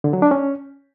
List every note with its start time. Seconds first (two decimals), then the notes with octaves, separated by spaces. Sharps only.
0.04 D3
0.13 F#3
0.22 D4
0.31 C#4